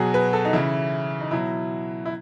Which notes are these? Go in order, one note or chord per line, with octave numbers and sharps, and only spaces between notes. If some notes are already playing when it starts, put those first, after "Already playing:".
Already playing: B2 F#3 F#4 G#4
B4
A4
D#4
C#3 E3 E4
D#4
B2 F#3 E4
E4